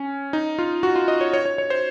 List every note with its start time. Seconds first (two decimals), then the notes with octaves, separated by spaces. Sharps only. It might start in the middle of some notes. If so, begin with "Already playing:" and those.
Already playing: C#4
0.33 D#4
0.59 F4
0.83 F#4
0.96 F4
1.08 D#5
1.21 C#5
1.33 C#5
1.46 C#5
1.58 C#5
1.70 C5